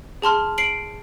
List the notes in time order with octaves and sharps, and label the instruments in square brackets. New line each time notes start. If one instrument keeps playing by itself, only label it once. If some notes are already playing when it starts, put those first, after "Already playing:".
[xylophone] G#4 A5 C6 F6
C7 D7 F#7